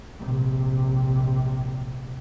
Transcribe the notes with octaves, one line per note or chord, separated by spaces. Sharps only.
A#1 C3